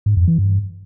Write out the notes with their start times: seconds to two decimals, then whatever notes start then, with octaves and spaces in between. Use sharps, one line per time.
0.06 G#2
0.17 F2
0.27 E3
0.38 G2